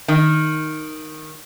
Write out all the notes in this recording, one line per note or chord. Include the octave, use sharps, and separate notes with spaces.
D#3